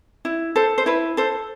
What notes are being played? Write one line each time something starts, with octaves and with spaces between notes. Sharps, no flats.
E4
A4 C5
C5
E4 B4
A4 C5